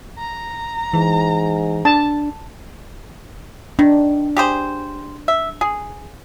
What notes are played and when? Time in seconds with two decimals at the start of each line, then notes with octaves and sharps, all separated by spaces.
0.18 A#5
0.94 G#2 E3
1.85 D4 A5
3.79 D#3 D4
4.37 G4 G#4 C5
5.28 E5
5.61 G#4